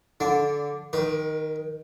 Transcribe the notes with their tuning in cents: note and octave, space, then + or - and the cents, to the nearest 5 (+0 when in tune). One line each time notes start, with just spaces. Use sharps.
D3 -20 D4 +0
D#3 +0 A#4 +45